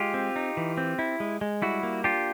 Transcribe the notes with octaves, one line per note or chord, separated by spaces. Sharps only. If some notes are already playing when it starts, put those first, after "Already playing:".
Already playing: G#3 F4 G4
C4
D#4
E3
C4
E4
G#3
G#3
G3 E4 F#4
A#3
D4 F4 G4